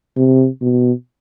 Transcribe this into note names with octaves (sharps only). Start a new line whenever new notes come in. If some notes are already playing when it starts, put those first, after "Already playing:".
C3
B2